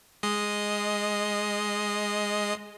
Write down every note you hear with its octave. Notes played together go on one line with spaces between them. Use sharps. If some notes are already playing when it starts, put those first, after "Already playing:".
G#3 D#5 C7